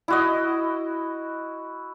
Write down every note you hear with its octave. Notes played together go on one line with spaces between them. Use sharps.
E4 F#4 D#5